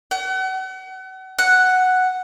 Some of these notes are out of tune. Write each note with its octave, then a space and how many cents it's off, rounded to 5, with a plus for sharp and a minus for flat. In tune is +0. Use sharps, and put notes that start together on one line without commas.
F#5 +35
F#5 +0